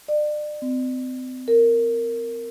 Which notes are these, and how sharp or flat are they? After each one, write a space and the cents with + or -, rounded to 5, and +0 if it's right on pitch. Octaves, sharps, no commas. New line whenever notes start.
D5 +35
C4 -35
A#4 -10